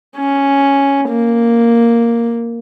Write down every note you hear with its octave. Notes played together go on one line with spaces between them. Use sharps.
C#4
A#3